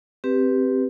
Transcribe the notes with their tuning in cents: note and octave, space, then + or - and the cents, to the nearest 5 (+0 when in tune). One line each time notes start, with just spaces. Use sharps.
C4 +0 G4 +0 B4 +0